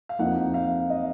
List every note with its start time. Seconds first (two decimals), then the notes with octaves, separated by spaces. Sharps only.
0.09 F5
0.19 F2 F3 A#3 D#4 F#5
0.54 F5
0.90 D#5